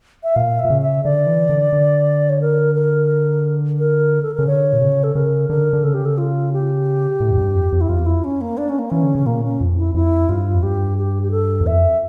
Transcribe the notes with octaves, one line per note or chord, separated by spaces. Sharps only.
E5
A#2 F5
E5
A#2
C#3
E5
D3 D5
E3
D3
D3
C#5
A#4
A#4
A#4
A4
C#3 A#4
D3 C#5
A#2
C#3
A4
C#3 A#4
D3 A#4
D3
C#3 A4
G4
A4
F4
G4
A2
F2
G2
F2
F2
E4
F2 F4
E2
F2 E4
C#4
A#3
D4
C#4
A#3
E3 C#4
D3
C#3
A#2 A#3
C#4
F2
E4
F2 E4
G2 F4
F2
G2 G4
G4
G4
A4
E2
E5
F2